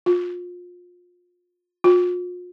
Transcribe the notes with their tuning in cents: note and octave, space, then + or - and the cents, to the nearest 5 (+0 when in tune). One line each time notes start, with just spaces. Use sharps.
F4 +25
F4 +40